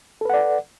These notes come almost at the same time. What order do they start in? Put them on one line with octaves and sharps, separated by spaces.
A4 B4 F#5 D5